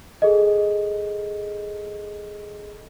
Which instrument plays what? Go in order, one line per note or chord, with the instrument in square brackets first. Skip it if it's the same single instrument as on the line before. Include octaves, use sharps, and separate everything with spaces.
[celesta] G#4 A4 D#5